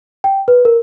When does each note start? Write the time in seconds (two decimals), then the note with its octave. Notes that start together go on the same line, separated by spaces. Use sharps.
0.24 G5
0.48 B4
0.65 A#4